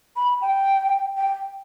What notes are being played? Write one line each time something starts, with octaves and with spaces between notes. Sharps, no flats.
B5
G5
G5